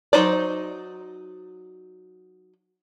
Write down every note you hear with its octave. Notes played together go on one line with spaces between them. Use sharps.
F#3 C4 D#4 C5 D5